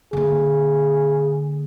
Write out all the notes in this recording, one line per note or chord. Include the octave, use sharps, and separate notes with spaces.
D3 A#3 G#4